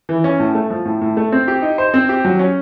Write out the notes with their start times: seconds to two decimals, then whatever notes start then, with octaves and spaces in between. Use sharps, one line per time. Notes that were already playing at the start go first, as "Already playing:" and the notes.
0.09 E3
0.24 C#4
0.39 A2
0.55 A3
0.70 F3
0.85 A2
1.01 A2
1.17 A3
1.32 C4
1.48 G4
1.62 D#4
1.78 C5
1.94 C4
2.09 G4
2.25 F#3
2.39 C#4